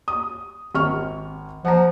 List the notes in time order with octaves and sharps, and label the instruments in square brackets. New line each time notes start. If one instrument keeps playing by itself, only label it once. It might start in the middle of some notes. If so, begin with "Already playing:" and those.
[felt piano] D#6
G#1 C#6 F6
[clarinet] F3 [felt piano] F#5 A#5